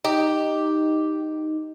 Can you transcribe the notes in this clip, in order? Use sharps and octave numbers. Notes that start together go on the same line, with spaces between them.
D#4 G4